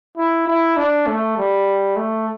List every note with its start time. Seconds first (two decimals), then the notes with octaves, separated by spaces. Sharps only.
0.18 E4
0.47 E4
0.77 D4
1.07 A3
1.37 G3
1.96 A3